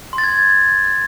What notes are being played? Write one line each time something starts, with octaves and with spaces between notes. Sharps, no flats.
C6
A6
G#6